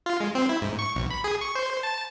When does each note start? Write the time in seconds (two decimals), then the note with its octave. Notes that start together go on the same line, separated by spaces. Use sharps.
0.06 F4
0.20 G#3
0.35 C4
0.49 E4
0.61 G#2
0.79 C#6
0.95 B1
1.11 B5
1.24 G#4
1.41 C#6
1.55 C5
1.83 A5